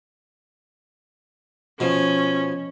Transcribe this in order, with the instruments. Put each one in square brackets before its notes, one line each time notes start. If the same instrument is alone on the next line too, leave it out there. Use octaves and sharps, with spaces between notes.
[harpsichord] B2 F3 [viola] C#4